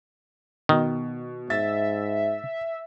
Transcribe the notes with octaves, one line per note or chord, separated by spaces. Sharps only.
B2 D#3
G#2 E5 A6